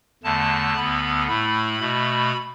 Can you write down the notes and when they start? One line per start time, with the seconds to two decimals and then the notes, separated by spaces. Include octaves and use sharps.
0.23 E2 D3 A3 A5
0.75 D2 D3 B3 B5
1.27 A2 A3 B5
1.80 B2 A3